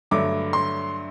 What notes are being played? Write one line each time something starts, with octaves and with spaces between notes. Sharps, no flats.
G2 D3 F#3 A3 D6
C6